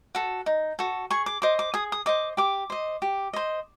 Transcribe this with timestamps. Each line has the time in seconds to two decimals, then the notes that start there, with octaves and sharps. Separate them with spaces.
0.15 F#4 A4
0.46 D#4
0.79 F#4 A4
1.11 G#4 C#6
1.26 D6
1.42 C5 D#5 D6
1.59 D6
1.74 G#4 D#6
1.92 D#6
2.06 C5 D#5 D6
2.37 G4 D6
2.70 C5 D#5
3.02 G4
3.33 C5 D#5